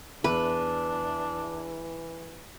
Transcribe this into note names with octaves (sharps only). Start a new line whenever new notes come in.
E2 E3 D4 B4